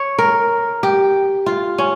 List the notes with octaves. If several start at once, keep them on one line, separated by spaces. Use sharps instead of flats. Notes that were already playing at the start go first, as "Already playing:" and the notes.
Already playing: C#5
A#4
G4
F4
C#4